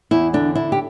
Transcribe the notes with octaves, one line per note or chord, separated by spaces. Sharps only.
E2 E4
D3 D4
D4 E4
G4